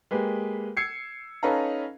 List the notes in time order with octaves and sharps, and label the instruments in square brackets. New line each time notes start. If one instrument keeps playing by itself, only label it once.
[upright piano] G#3 A#3 G4 B4
E6 G#6 C7 C#7
C#4 D#4 A4 B4 F5 A#5